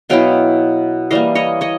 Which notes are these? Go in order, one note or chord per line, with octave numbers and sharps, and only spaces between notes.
B2 F#3 B3 E4 F5 G5
E3 G3 A#3 D#5 F5
C#5 D#5
C#5 D#5